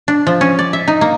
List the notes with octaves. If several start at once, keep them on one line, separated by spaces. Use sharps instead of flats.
D4
F3
C#4
D5
E5
D#4
A#3